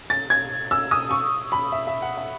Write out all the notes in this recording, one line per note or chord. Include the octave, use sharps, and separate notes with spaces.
A6
G#6
E6
D#6
C#6
B5
E5
E5
F#5
E5